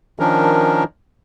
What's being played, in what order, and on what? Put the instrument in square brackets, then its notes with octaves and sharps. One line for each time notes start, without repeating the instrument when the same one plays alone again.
[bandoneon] D#3 F3 C#4 D4 A#4